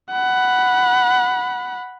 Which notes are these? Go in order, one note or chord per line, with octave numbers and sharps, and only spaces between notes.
F#5 B5